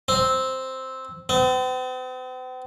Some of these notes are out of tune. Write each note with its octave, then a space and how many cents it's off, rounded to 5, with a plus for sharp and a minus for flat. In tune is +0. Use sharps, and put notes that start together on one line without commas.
C4 +0
C4 -45